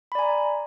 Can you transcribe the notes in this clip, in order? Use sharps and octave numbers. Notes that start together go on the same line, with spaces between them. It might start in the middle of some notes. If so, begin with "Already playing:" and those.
D5 G#5 A#5 B5